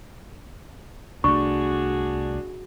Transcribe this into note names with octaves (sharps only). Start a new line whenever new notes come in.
C2 A3 D4 F#4 G#4 C#6